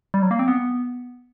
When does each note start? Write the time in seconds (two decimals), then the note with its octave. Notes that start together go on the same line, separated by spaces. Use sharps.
0.14 G3
0.22 F#3
0.31 A#3
0.39 C4
0.48 B3